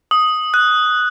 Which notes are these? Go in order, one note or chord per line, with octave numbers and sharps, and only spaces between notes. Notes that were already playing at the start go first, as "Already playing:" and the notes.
D#6
F#6